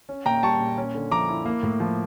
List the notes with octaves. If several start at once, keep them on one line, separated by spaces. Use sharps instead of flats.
C#4
A#2 G5 A#5
G3 A5 C#6
A#2
C#4
D3
F3 A#5 D6
E4
A#3
A2
F3